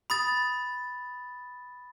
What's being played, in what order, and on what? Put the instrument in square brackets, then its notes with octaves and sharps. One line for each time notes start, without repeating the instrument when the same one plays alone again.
[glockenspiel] B5 D#6 A6